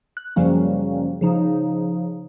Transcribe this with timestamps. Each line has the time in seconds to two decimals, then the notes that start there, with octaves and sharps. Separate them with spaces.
0.17 F#6
0.36 F#2 C#3 F3 G3 A#3 C#4
1.21 C#3 F3 D#4